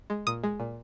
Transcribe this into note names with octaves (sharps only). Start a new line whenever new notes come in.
G#3
A#2 D#6
G#3
A#2